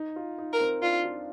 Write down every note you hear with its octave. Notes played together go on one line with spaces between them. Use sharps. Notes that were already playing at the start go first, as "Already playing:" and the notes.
Already playing: D#4
F4
D#4
A#4
C4
D4 F4
F4